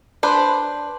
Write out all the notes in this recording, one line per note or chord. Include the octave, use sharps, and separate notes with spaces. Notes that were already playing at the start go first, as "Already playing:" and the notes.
D4 B4 C5